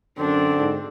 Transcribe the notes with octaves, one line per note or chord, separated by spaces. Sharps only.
F#2 D3 C4 D4
G#2